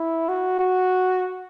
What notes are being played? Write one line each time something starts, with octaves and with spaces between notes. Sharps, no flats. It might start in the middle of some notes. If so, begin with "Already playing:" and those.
Already playing: E4
F#4
F#4